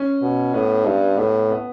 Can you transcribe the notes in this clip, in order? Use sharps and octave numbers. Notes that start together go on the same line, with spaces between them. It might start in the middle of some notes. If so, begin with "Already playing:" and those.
Already playing: C#4
B2
A2 B3
G2
A2 B3
B3